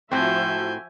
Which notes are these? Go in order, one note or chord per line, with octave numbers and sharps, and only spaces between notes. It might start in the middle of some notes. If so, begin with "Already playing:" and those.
A2 F3 C4 F#4 E5 G#5 G6